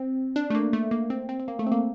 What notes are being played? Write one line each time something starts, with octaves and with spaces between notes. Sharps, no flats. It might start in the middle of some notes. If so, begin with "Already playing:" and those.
Already playing: C4
D4
A3
A#3
A3
A#3
C4
C4
C4
A#3
A3
C4
A#3